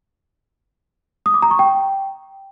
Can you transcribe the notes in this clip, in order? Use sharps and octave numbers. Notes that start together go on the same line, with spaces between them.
D#6
D6
A#5
C#6
G5